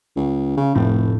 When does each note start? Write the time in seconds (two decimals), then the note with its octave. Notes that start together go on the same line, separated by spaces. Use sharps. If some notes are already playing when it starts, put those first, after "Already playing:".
0.16 C#2
0.57 C#3
0.75 F1 A2